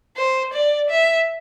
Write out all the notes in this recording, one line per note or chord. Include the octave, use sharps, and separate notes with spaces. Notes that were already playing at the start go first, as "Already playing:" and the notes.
C5
D5
E5